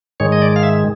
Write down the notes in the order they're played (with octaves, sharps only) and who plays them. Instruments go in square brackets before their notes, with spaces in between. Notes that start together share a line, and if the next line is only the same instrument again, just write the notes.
[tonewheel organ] G#2 D#3 G#3 C#5
D#5
D5
F5
E5